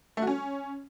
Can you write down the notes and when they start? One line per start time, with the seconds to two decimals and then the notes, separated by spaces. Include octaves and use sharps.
0.17 A3
0.22 F#4
0.27 C#4